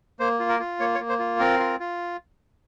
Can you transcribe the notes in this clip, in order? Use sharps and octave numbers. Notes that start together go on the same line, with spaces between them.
A#3 C5
F4
A#4
F4
A#3 C#5
C#5
A#3
C5
F4
C4 A#4
F4
F4